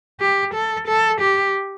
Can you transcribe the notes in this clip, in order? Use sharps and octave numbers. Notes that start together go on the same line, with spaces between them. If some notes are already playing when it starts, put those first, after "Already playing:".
G4
A4
A4
G4